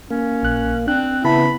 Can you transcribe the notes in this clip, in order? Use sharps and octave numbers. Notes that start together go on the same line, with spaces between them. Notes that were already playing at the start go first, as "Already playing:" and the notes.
A#3 C#4
A#1 F#6
C4 D4 F#6
C#3 B3 E4 A5 B5